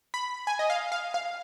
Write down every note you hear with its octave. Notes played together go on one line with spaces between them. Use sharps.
B5
G#5
D#5
F5
F5
F5